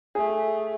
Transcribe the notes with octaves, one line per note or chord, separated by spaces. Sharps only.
A3 G#4